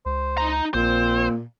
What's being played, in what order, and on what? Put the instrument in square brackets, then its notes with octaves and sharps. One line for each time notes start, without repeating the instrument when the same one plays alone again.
[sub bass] C#2 [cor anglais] C5
[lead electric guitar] D#4 A#5
[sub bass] A#1 [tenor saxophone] A#2 [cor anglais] C4 [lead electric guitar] C5